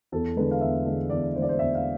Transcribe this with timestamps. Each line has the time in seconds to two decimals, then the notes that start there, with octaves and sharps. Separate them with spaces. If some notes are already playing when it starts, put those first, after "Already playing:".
0.12 E2 A4
0.37 D3 G#3 B4
0.51 F5
0.61 E2 E5
0.86 D3 G#3
1.10 E2 D5
1.35 D3 C5
1.39 G#3 D5
1.49 C5
1.59 E2 E5
1.75 F5